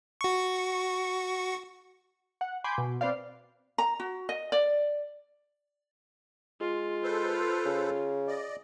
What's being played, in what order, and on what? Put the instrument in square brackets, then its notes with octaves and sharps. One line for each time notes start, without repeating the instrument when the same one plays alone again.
[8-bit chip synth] F#4 C#6
[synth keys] F#5
G#5 B5 C6 D6 G6
B2
C4 B4 C5 D5 F5
[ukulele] A#5
F#4
D#5
D5
[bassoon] G#3 [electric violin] F4
[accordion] A4 B4 C5
[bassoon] C#3
[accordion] D5 D#5